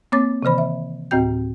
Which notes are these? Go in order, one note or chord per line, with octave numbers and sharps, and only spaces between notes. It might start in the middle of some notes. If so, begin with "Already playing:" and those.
A#3 C4 C#5 D6 A6
C3 D#3 E3 C5 B5
E5
D2 A2 C4 F#4 G5 G6